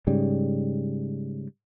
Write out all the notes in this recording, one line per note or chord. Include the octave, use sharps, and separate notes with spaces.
G#2 C#3 G3